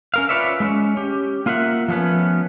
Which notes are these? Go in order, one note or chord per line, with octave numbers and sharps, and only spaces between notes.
C#4 A#4 F5
F4 B4 C#5 D5 E5
G#3 C4 C#4
C#4 G4
A#3 F4 A#4 E5 F#5
F3 F#3 A3 B3 C#4